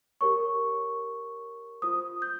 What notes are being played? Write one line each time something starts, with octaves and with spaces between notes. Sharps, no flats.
G4 A#4 C#5 C#6
F4 C5 D#6
G6